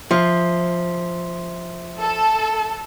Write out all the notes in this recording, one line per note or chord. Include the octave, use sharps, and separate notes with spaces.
F3 E5 C6
A4